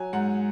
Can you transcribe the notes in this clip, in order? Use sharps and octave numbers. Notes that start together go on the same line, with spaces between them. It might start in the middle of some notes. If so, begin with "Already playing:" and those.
Already playing: F#3 G#5
G#2 F#5